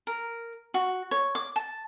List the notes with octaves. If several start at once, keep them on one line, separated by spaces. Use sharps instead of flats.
A#4
F#4
C#5
D6
A5